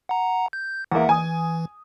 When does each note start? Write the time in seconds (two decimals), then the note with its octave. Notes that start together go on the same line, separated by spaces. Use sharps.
0.09 F#5 A#5
0.53 G6
0.92 E2 A#3 E5 F#5
1.09 E3 G#5 D#6